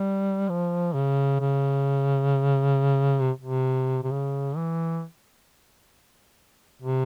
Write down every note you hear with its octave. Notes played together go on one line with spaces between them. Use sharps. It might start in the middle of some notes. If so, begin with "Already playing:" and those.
Already playing: G3
F3
C#3
C#3
C3
C3
C3
C#3
E3
C3